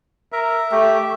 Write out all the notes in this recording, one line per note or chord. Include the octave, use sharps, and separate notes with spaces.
A#4 E5
A3 G4